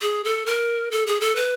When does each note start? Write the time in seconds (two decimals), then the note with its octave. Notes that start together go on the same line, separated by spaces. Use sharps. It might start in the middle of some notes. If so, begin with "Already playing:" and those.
0.02 G#4
0.24 A4
0.46 A#4
0.91 A4
1.07 G#4
1.21 A4
1.36 B4